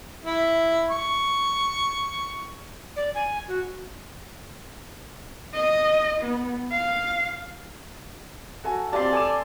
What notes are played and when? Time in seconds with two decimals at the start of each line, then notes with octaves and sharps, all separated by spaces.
0.24 E4
0.91 C#6
2.96 D5
3.14 G#5
3.48 F#4
5.53 D#5
6.22 B3
6.71 F5
8.64 F#4 A4 G#5
8.93 C4 F4 G4 D5 A5 C6
9.13 A4 G#5 D6 E7